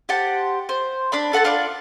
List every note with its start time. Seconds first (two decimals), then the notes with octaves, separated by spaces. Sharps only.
0.09 G4 C5 F#5 A5
0.69 C5
1.12 D4 D5 B5
1.33 A4 F#5 G#5 A5
1.44 D4 F4 B4 D5